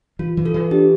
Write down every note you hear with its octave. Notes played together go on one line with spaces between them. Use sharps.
E3 F4
E3
F4 A4
E3
D4 G4